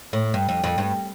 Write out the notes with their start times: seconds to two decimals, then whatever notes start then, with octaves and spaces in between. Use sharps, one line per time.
0.13 A2
0.34 G2
0.49 F2
0.64 F2
0.78 G2